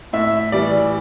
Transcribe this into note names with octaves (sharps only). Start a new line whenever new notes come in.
A2 E5
E3 G3 D5